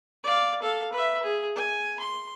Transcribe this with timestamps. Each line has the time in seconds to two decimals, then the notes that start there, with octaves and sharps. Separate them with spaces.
0.24 D5 F5
0.63 A4 F5
0.93 B4 E5
1.23 G#4
1.56 G#5
2.00 C6